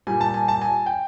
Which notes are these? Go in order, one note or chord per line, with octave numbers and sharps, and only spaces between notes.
A#2 G3 G#5
A5
G#5
A5
G#5
G5